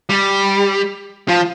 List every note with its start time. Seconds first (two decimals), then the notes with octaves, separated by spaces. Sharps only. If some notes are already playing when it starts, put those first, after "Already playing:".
0.09 G3
1.28 F3